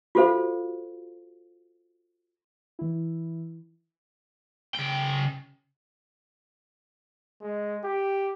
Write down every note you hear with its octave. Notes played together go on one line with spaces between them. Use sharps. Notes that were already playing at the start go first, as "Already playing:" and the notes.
F4 F#4 A4 C5 F5
E3 E4
C#3 G5
G#3
G4